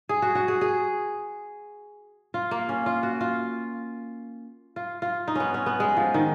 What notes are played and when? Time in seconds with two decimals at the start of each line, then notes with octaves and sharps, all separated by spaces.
0.09 G#4
0.22 F#4
0.35 F#4
0.48 G#4
0.61 G#4
2.34 F4
2.51 A#3
2.69 C#4
2.86 F4
3.03 F#4
3.21 F4
4.76 F4
5.02 F4
5.28 D#4
5.35 B3 C#4
5.54 C#4
5.66 B3
5.80 G#3
5.97 F3
6.14 D#3